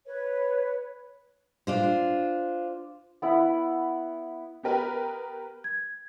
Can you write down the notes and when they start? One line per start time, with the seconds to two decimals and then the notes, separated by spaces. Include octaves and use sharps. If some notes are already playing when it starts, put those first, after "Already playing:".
0.06 B4 C#5
1.67 D4 F4 C5
3.22 B3 E4 F#5 B5
4.63 B3 G4 A#4 B4
5.64 G#6